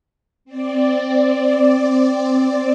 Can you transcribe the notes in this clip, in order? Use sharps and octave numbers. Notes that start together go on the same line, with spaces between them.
C4 D5